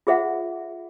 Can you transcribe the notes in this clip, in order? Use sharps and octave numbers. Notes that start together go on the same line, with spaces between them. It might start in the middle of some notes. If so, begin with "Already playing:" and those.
F4 G#4 C5 E5 F#5